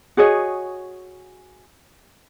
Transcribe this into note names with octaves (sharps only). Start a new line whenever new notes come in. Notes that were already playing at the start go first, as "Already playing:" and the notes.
F#4 G#4 C#5 D#5